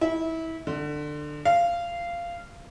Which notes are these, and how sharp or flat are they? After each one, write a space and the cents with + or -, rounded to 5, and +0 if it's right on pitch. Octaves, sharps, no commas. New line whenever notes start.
E4 -25
D3 +20
F5 -15